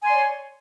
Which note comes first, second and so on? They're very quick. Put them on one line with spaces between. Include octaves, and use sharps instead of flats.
G#5 C6 D5 C#5